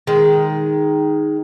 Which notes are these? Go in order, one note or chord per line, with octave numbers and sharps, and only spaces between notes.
D#3 G#3